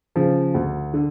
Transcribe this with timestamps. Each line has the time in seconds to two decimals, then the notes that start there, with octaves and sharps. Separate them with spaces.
0.16 C#3 F3
0.54 D2
0.94 D3